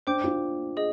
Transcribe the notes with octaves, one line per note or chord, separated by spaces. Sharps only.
D4 C5 G5 D6 G6
D4 F4
G#4 D#5